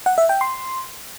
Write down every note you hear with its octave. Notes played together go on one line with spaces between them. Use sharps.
F#5
E5
G5
C6